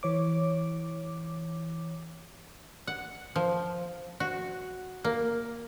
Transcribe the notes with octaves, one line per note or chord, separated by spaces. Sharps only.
E3 C#5 D6
F#5
F3
F#4
A#3